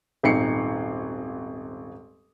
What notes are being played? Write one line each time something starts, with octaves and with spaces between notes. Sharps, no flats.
D#1 G#1 D#4 C7 C#7